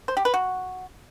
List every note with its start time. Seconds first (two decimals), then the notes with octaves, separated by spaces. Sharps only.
0.08 C5
0.17 G4
0.25 B4
0.34 F#4